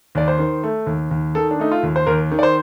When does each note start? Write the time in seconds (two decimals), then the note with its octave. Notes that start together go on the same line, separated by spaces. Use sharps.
0.15 D#2 D5
0.28 C5
0.39 D#3
0.63 A3
0.86 D#2
1.11 D#2
1.35 D#3 A4
1.51 D4
1.60 A3 D#4
1.72 F4
1.83 D#2
1.96 C5
2.06 D#2 A#4
2.31 D#3
2.39 D5
2.43 C5